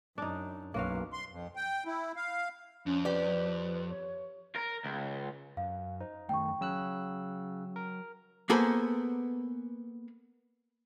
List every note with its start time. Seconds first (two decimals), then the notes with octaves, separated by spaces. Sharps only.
0.18 F#2 D4 D#4
0.74 B1 F#2 A#3 F#4 F5
1.13 C6
1.31 F2
1.56 G5
1.86 E4
2.16 F5
2.86 F2 C#4
3.05 G4 B4 D5
3.90 C#5
4.56 A#4
4.84 C#2
5.57 F#2 F5
6.00 D#4 C5
6.29 F#2 D#3 A3 G5 C#6
6.61 C#3 F#3 E6 F#6
7.76 A#4
8.50 A#3 B3 G#4 A4 B4 C5